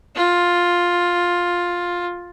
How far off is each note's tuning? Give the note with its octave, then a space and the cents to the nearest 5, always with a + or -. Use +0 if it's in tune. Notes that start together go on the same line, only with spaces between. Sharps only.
F4 +10